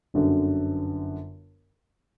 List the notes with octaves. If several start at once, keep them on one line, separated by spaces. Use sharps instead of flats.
G1 F#2 D3